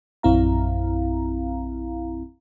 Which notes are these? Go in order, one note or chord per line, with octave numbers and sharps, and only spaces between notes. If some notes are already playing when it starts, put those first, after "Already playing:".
A#1 F#2 C4 E4 F5 A#5